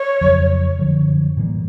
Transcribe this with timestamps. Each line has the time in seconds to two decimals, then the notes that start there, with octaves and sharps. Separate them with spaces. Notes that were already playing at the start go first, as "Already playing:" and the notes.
Already playing: C#5
0.21 F2 C#3 F#3
0.79 F#2 D3 F3
1.36 A2 E3 G3 A#3